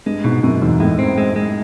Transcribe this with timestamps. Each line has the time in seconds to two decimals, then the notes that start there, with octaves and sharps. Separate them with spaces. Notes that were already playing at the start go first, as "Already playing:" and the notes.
0.06 G2 G#3
0.24 G#2 B2
0.43 F#2 B2
0.61 E2 G#2
0.80 A2 G#3
0.99 C4
1.18 G#3
1.36 G#3